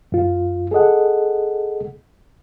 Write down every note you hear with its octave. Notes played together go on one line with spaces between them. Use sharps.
F#2 F4
G#4 A4 D#5 F#5